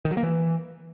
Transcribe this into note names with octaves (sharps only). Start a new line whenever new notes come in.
D#3
F#3
A#3
E3